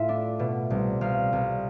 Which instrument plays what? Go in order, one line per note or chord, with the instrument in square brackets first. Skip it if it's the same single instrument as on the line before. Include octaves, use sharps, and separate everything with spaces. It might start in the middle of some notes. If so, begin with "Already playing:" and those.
Already playing: [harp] A2 F4 A4 E5
D4
B2
C2
C2 F5
C2